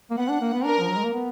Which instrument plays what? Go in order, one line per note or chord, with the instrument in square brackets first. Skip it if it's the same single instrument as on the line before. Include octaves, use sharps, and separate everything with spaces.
[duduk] A#3
[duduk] B3 [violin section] F#5
[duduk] D4
A#3
B3
[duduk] D4 [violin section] A#4
[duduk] F3
F#3
G#3
A#3
B3